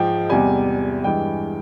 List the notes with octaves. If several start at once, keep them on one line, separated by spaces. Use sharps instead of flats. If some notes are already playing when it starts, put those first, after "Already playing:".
Already playing: G#2 F3 G#3 G5
E2 C3 G3 G#5
G2 E3 G#3 G5